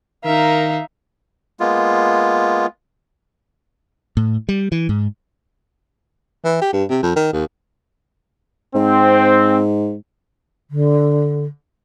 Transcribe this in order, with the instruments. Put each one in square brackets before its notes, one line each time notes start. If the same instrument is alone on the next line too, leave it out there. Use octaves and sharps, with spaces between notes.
[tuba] D#3 [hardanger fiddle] D#4 E5 [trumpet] A#4 [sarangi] F5
[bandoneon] G#3 A#3 B3 F4
[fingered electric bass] A2
G3
E3
G#2
[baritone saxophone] E3
G4
G2
C3
F2
D#3
D#2
[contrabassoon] G#2 [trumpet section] C4
[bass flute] D3